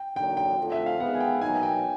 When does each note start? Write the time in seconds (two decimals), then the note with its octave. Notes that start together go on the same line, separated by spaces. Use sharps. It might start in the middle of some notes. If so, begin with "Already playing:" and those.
Already playing: G5
0.16 D3 F#3 A#3 D#4 G5
0.37 G5
0.58 F2 D3 F3 A3
0.72 E5
0.86 F5
0.99 D#3 G#3 B3 F#5
1.14 G#5
1.20 G5
1.41 B2 F#3 A#3 D#4 G#5
1.63 G5